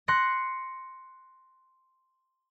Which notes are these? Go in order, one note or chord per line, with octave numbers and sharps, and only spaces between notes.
C6 F#6 A#6 C#7